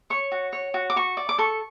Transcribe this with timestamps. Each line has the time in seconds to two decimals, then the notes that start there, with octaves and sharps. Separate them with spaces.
0.10 C#5 C#6
0.32 F#4
0.53 C#5
0.74 F#4
0.90 D6
0.96 F#4 C#6
1.17 D5
1.29 D6
1.38 A4 C#6